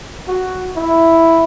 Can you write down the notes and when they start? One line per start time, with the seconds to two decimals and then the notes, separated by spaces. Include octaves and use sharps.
0.28 F#4
0.76 E4